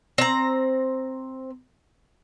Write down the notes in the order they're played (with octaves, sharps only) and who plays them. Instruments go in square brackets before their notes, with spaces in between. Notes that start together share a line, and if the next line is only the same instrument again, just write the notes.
[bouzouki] C4 A#5